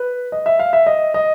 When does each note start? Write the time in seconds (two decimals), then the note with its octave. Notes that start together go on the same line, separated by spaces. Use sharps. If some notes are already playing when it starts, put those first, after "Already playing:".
Already playing: B4
0.32 D#5
0.46 E5
0.59 F5
0.73 E5
0.87 D#5
1.14 D#5